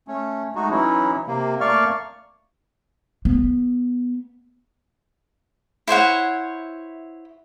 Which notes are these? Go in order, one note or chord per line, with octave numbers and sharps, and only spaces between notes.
A3 C#4
G#3 A3 D#4 F#4
E3 F#3 C#4 D#4 E4
C3 A#3
A3 A#3 D5 F5 C#6 F6
B3
E4 C5 C#5 F#5